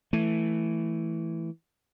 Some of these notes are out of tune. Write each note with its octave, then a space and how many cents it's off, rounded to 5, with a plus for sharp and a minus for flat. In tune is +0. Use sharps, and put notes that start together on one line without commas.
E3 +0 A3 +0